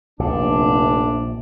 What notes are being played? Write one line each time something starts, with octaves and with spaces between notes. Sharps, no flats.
F1 A#1 C3 D4